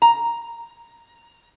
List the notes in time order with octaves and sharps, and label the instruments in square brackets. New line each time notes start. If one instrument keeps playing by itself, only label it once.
[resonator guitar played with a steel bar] A#5